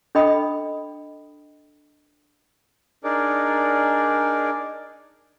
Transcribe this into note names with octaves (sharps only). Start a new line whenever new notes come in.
D4 A4 D#5 G5 B5 D#6
D4 D#4 G#4 A#4 D5